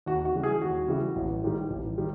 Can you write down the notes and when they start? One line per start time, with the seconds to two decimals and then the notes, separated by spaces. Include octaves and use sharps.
0.06 D#2 F#4
0.25 F#4
0.35 C#3 E3 G3
0.43 G#4
0.62 D#2 F#4
0.88 C#3 E3 G3
1.16 A1
1.44 G#2 D#3 G3
1.70 A1
1.98 D#3 G3